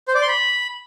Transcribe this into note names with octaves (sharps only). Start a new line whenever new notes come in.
C5
D5
C6
B5